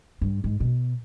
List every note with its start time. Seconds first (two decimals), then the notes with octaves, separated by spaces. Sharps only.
0.21 G2
0.44 G#2
0.60 B2